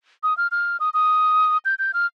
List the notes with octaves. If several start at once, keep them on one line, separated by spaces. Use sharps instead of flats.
D#6
F6
F6
D#6
D#6
G6
G6
F6